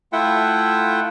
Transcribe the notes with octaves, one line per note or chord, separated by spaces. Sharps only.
A3 E4 F4 E5 F#5 G5